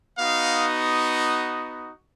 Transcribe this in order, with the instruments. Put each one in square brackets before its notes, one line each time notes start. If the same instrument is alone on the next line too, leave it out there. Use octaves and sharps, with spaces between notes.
[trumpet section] B3 D#4 F#4 F5